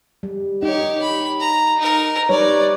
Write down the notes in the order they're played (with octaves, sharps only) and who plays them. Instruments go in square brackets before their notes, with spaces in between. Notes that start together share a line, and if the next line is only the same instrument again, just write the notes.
[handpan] G3
[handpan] D#4 [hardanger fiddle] G4 C#5
[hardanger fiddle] B5
A#5
D#4 A#4
[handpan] G3 B4 C#5 [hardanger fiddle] D#4 D5